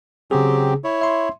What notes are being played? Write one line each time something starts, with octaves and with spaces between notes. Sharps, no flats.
C#3 F#3 C4 G4 G#4
E4 C#5
E5 C6